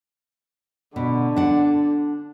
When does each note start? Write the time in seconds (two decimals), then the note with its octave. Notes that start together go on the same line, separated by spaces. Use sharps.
0.96 B2 D3
1.36 D4 F#5